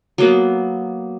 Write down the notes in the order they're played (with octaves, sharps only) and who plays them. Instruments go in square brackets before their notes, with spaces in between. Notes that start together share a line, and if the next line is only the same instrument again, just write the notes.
[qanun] F#3 A#3 B3